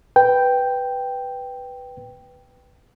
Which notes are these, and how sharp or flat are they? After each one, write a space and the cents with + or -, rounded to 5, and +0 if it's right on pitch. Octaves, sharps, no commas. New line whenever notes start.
B4 +0 G5 +0